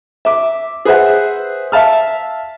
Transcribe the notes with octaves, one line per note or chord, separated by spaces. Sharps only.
E5 D6
G#4 B4 C5 E5 F#5
E5 F5 A5 F6